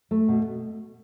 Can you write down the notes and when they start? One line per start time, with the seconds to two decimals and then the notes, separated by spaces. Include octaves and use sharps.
0.11 A3
0.29 B2